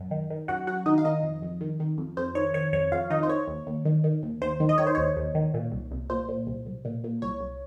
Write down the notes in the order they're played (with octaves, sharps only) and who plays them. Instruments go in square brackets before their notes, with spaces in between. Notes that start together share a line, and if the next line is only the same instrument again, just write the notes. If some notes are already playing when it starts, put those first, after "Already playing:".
Already playing: [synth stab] F#2
D#3
D#3
F#2 F#4 F#5
F#2 F#4 F#5
D#3 D#4 D#5
F5
D#3 D#4 D#5
F2
F2
D#3
D#3
F2
F2 C5
D#3 C#5
D#3 C#5
F2 C#5
F2 F4 F5
D#3 D#4 D#5
C5
D#3 C#5
D#2
D#2
D#3
D#3
D#2
D#2 C5
D#3
D#5
D#3 C#5
C5
D#2 C#5
D#2
D#3
A#2
C2
C2
A#2 C5
A#2
C2
C2
A#2
A#2
C2 C#5
C2